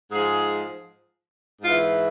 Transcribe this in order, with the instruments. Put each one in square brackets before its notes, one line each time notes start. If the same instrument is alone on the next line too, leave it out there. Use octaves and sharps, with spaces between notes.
[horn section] G#2 F3 G#4
G#2 E3 F4